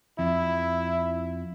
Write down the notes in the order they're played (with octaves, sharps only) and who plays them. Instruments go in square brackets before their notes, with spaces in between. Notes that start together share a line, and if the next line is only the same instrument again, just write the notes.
[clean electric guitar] F2 [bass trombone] E4